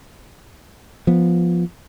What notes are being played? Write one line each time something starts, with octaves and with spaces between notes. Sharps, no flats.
F3 B3